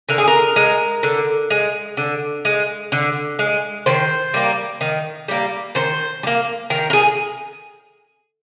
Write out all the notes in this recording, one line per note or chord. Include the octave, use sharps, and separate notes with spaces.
D3 A#4
G#4
A#4
G#3
D3
G#3
D3
G#3
D3
G#3
D#3 C5
G3 A#3
D#3
G3 A#3
D#3 C5
G3
A#3
D#3 A#4
A#4
G#4